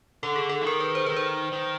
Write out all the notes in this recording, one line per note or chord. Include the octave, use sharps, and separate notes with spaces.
D3 A4
G#4
A4
E3
D#3 A#4
B4
C5
D#3 B4
C5
D#3